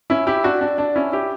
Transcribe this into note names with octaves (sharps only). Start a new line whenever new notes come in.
C#4 E4
E4 G4
D4 F#4
D4
D4
C#4 E4
E4 G4